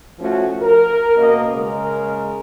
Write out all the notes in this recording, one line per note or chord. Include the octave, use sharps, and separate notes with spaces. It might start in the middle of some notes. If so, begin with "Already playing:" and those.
F3 A3 C#4 F#4
A#4
B2 A#3 C#4 D#5
C#3 G#3 A#4